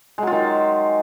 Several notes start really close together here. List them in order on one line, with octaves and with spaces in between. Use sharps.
G#3 F#3 F4 D#3